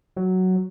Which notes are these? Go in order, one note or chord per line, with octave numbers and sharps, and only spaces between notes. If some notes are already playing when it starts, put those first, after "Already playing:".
F#3